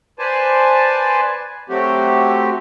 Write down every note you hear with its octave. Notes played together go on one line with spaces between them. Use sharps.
B4 C5 D5 G#5 A5
F#3 A3 C4 F#4 G4